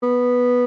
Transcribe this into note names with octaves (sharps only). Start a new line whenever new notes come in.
B3